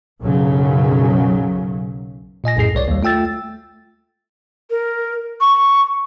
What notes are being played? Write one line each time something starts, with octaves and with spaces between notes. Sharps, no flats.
B1 F#2 C#3 F#3
A#2 D#5 G#5 A#6
B1 F#2 A2 G#4 C7
C2 C#5 D5
D#2 G3
A3 F4 G5 E6 A6
A#4
C#6